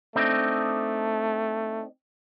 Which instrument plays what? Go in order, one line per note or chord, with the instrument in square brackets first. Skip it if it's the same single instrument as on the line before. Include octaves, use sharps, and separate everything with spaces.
[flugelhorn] A3 [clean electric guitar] C4 D4 D#4